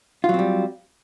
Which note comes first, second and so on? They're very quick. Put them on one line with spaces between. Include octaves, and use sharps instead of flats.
F4 F#3 C4 G3